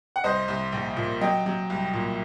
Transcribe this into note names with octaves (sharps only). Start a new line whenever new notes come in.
F#5
C2 C5 D#5
C2
A#1
A#2
F#3 D#5 G5
F#3
C2
A#2